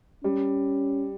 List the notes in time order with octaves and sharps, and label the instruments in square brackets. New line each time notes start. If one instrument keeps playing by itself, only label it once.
[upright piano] G3 [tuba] C#4